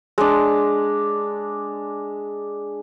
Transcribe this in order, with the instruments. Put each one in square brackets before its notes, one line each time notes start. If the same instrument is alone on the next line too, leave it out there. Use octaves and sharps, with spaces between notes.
[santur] G#3 D4